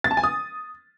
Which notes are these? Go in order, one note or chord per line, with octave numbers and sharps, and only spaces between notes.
A6
A5
G#5
D#6